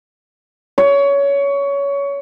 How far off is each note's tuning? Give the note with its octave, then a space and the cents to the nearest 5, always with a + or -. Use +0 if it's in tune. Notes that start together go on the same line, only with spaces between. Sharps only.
C#5 +20